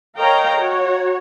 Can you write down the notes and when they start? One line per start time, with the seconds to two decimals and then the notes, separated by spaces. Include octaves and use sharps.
0.18 A#4 C#5 D#5 F5 G5 A#5
0.53 F#4 C#5